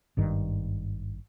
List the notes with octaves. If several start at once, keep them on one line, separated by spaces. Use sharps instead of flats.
G#1 G2 D#3